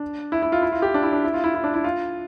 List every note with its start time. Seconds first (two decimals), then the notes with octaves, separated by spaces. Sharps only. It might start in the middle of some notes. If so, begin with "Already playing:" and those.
Already playing: D4
0.32 E4
0.42 E4
0.52 F4
0.62 E4
0.72 F4
0.82 G4
0.94 D4
1.03 E4
1.13 D4
1.24 E4
1.34 F4
1.44 E4
1.54 E4
1.64 D4
1.74 E4
1.84 F4